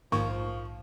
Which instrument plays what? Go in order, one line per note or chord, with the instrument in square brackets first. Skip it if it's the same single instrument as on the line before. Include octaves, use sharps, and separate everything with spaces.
[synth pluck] A#1 G#2 [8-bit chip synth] D#3 A#3 [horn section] F3 [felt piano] C#6